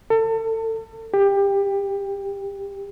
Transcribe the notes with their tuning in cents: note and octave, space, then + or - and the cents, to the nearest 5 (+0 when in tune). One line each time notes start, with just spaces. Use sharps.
A4 +35
G4 +20